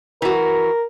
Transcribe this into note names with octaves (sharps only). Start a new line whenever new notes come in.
E3 F#4 A#4